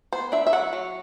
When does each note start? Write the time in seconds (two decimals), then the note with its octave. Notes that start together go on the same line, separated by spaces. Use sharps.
0.13 B3 C5
0.32 D4 E5
0.47 E5
0.53 F#3 F#5
0.73 F#3